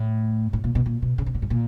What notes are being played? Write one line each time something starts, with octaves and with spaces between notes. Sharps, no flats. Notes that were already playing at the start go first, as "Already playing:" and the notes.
Already playing: A2
A2
A#2
B2
A#2
B2
C#3
C3
A#2
G#2
A#2